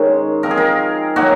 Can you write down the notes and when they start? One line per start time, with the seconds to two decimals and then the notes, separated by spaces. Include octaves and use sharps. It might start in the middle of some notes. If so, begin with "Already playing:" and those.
Already playing: D#3 G#3 C#4 C5
0.43 F3 C4 D#4 A#4
0.51 G#4
0.57 A#4
1.16 D#3 F#3 A#3 D#4 F#4